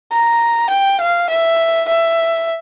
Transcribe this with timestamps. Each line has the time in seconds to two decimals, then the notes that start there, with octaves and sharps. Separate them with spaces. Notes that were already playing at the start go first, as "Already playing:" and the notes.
0.12 A#5
0.70 G5
1.01 F5
1.30 E5
1.88 E5